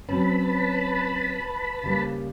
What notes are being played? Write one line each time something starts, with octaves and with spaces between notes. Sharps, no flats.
F#3 C4 C#4 B4 A5 B5
C#3 G3 A#3